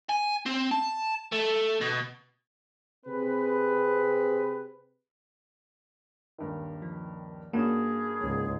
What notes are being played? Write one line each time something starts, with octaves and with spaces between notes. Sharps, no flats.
G#5
C4
A5
A3
B2
C3 C4 G#4 B4
D#1 G2 D#3
F3
G2 A#3 C#4 F#4 G#4
C#2 G#2